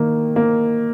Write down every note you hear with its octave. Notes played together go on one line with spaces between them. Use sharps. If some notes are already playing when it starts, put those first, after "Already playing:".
Already playing: D#3 A#3
A#3